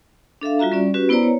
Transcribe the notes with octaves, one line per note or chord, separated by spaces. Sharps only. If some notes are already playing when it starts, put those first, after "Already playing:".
D4 A4 E5 F5
G3 F4 F#4 E5 A#5
G3 C#4 D5
C#4 F#4 G4 B4
B3 E4 B4 C5 D5 A#5
C#5